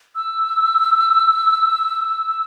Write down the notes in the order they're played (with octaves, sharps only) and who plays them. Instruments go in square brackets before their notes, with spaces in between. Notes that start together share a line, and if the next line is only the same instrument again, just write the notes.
[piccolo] E6